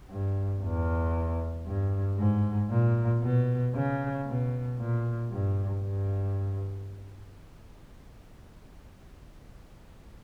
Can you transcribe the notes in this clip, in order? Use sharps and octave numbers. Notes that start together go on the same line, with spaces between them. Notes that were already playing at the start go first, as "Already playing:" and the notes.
G2
E2
G2
G#2
A#2
B2
C#3
B2
A#2
G2
G2